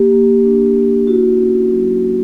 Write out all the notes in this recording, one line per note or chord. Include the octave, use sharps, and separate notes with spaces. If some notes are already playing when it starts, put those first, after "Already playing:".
Already playing: A#3 G4
A#3
D4
A#3
E4 F#4
C#4
F#3
E4